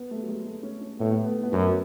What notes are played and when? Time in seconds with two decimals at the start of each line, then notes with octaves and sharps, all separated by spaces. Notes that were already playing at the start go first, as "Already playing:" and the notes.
Already playing: B3
0.11 A3
0.23 F#3
0.28 G#3
0.46 A3
0.63 C#4
0.81 C#4
0.99 A2 B3
1.11 A3
1.24 B3
1.43 B3
1.52 F#2 C#4